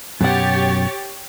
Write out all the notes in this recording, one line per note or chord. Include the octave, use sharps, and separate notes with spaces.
F#2 B2 G4 C#5 F#5 A6